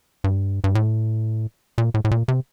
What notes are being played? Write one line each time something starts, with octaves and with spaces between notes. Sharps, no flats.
G2
G2
A2
A#2
A2
A2
A#2
C3